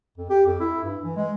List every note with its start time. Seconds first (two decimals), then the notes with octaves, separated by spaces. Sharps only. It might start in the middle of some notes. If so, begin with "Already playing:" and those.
0.17 F2
0.30 G4
0.46 F2
0.60 E4
0.83 G2
1.04 E3
1.17 G#3